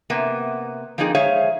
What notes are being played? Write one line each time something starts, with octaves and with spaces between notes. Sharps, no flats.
C3 A#3 B3
F3 A#3 C4 D#4 G#4
G#3 G#4 C5 C#5 E5 F5